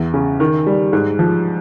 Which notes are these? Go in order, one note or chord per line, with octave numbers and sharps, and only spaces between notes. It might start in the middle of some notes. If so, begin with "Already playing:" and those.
Already playing: E2
C#3
D#3
G3
G#2
F3